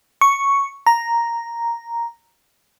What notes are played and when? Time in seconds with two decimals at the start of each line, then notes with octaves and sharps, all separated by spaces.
0.21 C#6
0.87 A#5